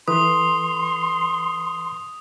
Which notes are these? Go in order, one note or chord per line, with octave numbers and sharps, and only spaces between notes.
E3 A4 B4 C6 D#6